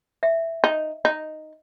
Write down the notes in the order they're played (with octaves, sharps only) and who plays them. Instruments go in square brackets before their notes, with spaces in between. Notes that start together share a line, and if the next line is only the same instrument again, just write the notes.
[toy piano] E5
[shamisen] D#4
D#4